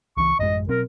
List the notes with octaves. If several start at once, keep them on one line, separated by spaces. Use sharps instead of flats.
C#2 E3 C#6
A1 F#2 G#3 D#5
B2 F#3 C4 A#4